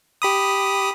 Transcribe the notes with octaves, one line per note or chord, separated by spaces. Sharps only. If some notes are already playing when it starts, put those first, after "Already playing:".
G4 B5 D#6